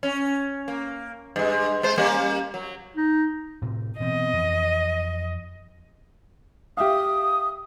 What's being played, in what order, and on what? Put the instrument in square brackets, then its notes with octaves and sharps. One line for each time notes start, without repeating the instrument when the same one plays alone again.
[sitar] C#4
A#3
G2 G#3
G#3 C5
G3 A#3 C#4
F#3
[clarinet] D#4
[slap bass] A2 C3
[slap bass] B2 E3 C4 [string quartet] D#5
[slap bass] F2 E3
[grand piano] G4 E5 F5 [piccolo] D#6